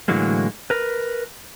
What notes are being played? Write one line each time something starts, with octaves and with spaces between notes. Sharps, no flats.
A2 D3 E3 F#3 G#3 A#3
A#4 B4